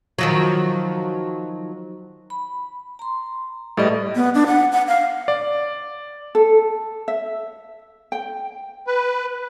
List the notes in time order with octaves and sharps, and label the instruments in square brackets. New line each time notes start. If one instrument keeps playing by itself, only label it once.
[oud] D#3 F3 F#3
[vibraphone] B5
A#5 C6
[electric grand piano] A2 G3 D#5 [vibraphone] G#4 B4 D5
[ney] B3
D4
F#5
F#5
F5
[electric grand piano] D5
[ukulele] A4
E5
G5
[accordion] B4